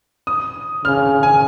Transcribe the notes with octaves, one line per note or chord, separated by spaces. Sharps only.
D#6
C#3 F6
G#5